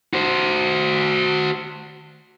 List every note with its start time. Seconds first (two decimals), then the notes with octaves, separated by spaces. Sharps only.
0.13 F#4 C5